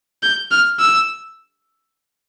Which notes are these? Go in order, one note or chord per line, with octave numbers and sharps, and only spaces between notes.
G6
F6
E6